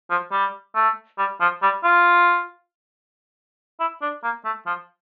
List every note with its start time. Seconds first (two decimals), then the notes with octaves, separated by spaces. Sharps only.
0.10 F3
0.32 G3
0.75 A3
1.18 G3
1.40 F3
1.62 G3
1.84 F4
3.80 E4
4.01 D4
4.23 A#3
4.45 A3
4.66 F3